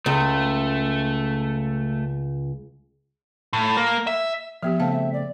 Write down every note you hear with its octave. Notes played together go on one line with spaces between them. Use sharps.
C#2 A3
A2
A#3
E5
F3 B3 G4 E5 F6
C#3 A3 C4 F5 A5
E5
D5